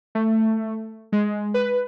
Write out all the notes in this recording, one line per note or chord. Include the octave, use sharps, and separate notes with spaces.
A3
G#3
B4